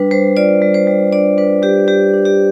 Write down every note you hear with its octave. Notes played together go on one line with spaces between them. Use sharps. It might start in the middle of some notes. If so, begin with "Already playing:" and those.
Already playing: G3 D4 B4
G3 C5
F4 D5
G3
C5
G3
D4 D5
D4 B4
G3 G4
G3 G4
D4
G4